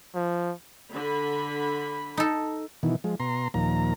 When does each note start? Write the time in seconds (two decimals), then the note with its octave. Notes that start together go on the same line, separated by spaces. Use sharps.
0.15 F3
0.92 D3 B5
2.17 D#4 A4
2.83 B2 D#3 E3
3.04 F3 G#3
3.20 B2 A#5 C6
3.54 D#2 A#2 F3 A#5